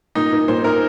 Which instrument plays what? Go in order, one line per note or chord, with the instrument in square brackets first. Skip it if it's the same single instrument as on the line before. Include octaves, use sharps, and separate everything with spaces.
[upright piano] A#2 [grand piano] D#4
[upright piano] A#3 D#4
[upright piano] A#2 [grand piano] C5
[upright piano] A#3 D#4 [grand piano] A#4